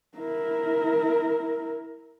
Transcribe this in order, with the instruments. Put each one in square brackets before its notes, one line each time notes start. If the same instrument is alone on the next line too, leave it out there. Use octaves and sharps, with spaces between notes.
[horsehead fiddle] E4 A#4